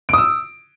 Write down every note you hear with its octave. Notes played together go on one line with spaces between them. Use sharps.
D#6 E6 D7